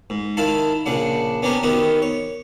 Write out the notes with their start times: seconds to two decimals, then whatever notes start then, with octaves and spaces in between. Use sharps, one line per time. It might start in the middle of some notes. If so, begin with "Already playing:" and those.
0.10 G#2
0.37 D#3 E4 F5 A5 B5
0.86 A#1 C#3 D4 F#5
1.42 B3 C#4 D4 G4 A#4 C5
1.63 D#3 B3 C4 D#4 F#4 G4
2.02 C#5